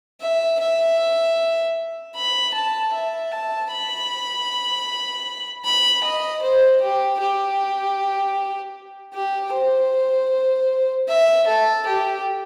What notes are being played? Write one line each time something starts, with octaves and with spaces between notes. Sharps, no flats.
E5
E5
B5
A5
E5
A5
B5
B5
D#5
C5
G4
G4
G4
C5
E5
A4
G4